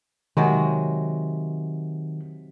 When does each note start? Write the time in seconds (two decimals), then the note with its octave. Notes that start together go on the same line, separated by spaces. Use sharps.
0.37 C3 D#3 F#3 G#3